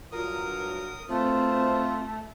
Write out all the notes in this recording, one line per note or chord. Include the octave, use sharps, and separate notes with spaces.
G2 F#3 F4 A#4 D#6
D2 B2 A3 C4 F4 C5